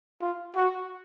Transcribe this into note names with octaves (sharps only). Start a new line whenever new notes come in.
F4
F#4